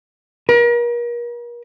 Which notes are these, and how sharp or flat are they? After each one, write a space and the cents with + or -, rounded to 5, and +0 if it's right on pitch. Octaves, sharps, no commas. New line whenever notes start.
A#4 +40